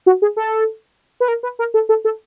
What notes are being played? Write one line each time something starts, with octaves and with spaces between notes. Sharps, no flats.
F#4
G#4
A4
B4
A#4
B4
A#4
A4
A4
A4